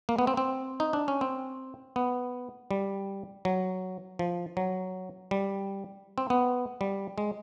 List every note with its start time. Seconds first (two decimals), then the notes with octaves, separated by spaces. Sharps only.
0.09 A#3
0.19 B3
0.27 C4
0.37 C4
0.80 D#4
0.93 D4
1.08 C#4
1.21 C4
1.96 B3
2.71 G3
3.45 F#3
4.19 F3
4.57 F#3
5.31 G3
6.18 C4
6.30 B3
6.81 G3
7.18 G#3